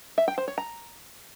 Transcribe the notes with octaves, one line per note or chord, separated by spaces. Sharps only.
E5
G5
C5
C#5
A#5